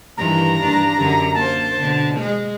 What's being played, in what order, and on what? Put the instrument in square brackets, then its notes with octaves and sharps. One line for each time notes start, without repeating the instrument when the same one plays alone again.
[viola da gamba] G2 D#3 E3 [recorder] A#5
[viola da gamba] G2 D4
F#2 D3
[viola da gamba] A#3 C5 [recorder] A5
[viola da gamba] B2 D3
G#3